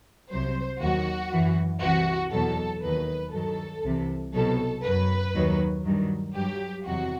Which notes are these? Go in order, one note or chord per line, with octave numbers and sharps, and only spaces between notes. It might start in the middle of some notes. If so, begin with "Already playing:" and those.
C2 C3 F#3 C5
D#2 D#3 F#3 F#4
F#2 E3
C2 C3 E3 F#4
E2 B2 F#3 A4
D#2 D#3 F#3 B4
G2 D#3 F#3 A4
C2 C3 E3
C2 B2 F#3 A4
F#2 F#3 B4
D#2 D#3 F#3
G2 D#3 F#3
G2 F#3 G4
E2 C3 D#3 F#3 F#4